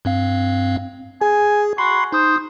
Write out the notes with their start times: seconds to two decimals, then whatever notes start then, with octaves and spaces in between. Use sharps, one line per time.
0.05 G2 C4 F5
1.21 G#4 G#5
1.78 F#4 B5 C6 C7
2.12 D#4 C5 D#6